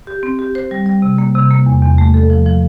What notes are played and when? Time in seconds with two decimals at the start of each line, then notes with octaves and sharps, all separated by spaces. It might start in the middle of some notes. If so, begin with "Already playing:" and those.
0.07 G4
0.23 C4
0.39 G4
0.55 C5
0.71 G3
0.86 G3
1.02 C3
1.18 A#3
1.35 C3
1.50 A#3
1.66 E2
1.82 E2
1.98 A3
2.14 A4
2.30 F3
2.46 F3